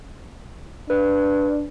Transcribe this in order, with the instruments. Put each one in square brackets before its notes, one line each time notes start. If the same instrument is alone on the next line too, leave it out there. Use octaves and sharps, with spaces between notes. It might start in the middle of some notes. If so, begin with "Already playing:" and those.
[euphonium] D4 [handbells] B4